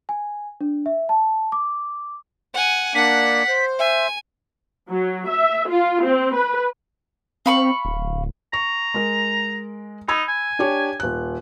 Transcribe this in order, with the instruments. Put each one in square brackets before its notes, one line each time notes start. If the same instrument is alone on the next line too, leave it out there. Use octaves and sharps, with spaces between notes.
[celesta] G#5
D4
E5
A5
D6
[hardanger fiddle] F#5 G#5
[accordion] A#3 D4 [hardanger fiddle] F#5 [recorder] B6
[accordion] C5
[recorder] E5 [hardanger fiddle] G#5
[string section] F#3
E5
F4
C4
B4
[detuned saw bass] C4 [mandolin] F5 B5 C#6
[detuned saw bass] D1
[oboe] A#5 [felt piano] C#6
[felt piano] G#3 A#4
[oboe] D#4 [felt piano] B5 E6 G#6
[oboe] G#5
[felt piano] D4 G4 C#5
D#1 F#6